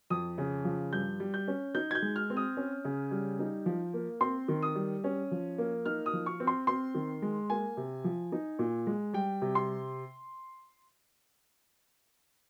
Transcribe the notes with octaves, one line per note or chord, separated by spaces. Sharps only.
F2 D#6
C#3
F3
G2 G6
G3
G6
C#4
D#4 G6
G#6
G6
G#3
F6
C4
D#6
C#4
C#3
G3
D#4
F3
A#3
C4 C6
D#3
D#6
G3
C#4
F3
A#3
D#4 F6
D#6
F3
C#6
C4
C6
C4 C6
D#3
G#3
A#3 G#5
C3
F3
D#4
A#2
G#3
G3 G5
C3
C6